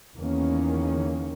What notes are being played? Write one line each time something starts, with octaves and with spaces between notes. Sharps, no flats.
E2 D#3 A#3 C#4